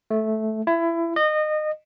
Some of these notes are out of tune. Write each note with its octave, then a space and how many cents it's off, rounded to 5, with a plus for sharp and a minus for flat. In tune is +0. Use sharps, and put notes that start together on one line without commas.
A3 -10
E4 +25
D#5 -25